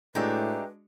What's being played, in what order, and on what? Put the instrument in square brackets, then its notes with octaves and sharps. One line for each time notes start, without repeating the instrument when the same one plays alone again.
[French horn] A2 [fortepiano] G#3 D4 F#4 [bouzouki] D#4 G4 E5 [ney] B4